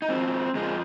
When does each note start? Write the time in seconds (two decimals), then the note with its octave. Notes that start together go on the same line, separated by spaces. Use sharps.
0.02 D#4
0.09 G#2 F3 C4
0.55 F2 F3 G#3